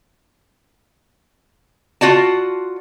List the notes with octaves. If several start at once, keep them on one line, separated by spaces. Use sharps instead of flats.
F4 F#4 D5 A5